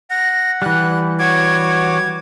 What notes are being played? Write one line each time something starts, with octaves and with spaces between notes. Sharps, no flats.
F#5 A#6
E3 G3 F#6
F#4 C#5 D6 G#6